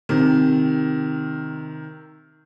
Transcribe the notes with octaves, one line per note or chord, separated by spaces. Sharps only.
C3 D#3